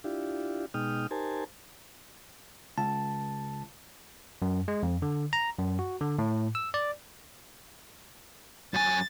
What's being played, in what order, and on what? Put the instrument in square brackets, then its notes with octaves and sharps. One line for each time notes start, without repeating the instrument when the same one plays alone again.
[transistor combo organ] D4 E4 F4 G4
B2 G#3 D#4 G5 D#6 F6
D#4 G4 A#4 C5 G#5 A5
[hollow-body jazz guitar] C#2 [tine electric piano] A5
[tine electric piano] F#2
G#3
F2
D3
A#5
F#2
F#4
D3
A2
E6
D5
[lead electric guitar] F#2 G#5 [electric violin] A6